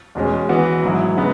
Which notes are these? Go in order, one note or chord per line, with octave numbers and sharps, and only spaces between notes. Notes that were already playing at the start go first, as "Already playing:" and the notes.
E2 B2 G#3 C#4
E3 B3 F#4
G#2 F#3 E4
C#3 G#3 B3 F#4